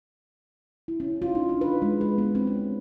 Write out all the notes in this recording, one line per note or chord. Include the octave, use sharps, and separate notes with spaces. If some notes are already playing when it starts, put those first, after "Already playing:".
E4
C#4
F4
D#4
D4
B4
G#3
B4
B3
C4
C#4